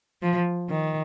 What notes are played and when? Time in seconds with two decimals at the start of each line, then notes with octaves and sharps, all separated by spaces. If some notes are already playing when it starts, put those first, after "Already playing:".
0.22 F3
0.69 D#3